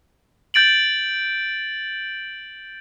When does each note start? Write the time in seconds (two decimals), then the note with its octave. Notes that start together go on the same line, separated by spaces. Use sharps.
0.54 G6 A6 D7 F#7